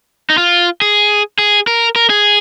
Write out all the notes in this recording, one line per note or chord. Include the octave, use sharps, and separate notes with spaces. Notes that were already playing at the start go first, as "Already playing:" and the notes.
D#4
F4
G#4
G#4
A#4
A#4
G#4